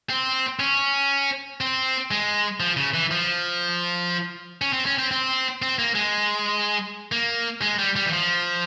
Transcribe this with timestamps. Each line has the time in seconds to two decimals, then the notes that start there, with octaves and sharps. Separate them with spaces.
0.10 C4
0.59 C#4
1.61 C4
2.11 G#3
2.60 F3
2.77 C#3
2.94 E3
3.11 F3
4.61 C#4
4.73 C4
4.86 C#4
4.99 C4
5.11 C4
5.62 C4
5.79 A#3
5.95 G#3
7.12 A#3
7.62 G#3
7.79 G3
7.96 G3
8.06 E3
8.13 F3